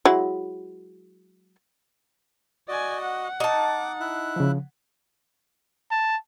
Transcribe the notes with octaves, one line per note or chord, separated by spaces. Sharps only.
F#3 G#3 E4
F#4 D5 D#5 G#5
F#5
D#4 A5 D6
E4 F#6
C#3 F3
A5